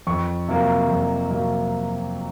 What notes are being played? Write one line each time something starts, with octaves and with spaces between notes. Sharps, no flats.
F2 C#6
C3 F#3 A#3
F2
C3 F#3 A#3